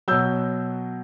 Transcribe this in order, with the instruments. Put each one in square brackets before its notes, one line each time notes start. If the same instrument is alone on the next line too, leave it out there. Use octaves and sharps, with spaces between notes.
[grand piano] B2 F#3 E6 G6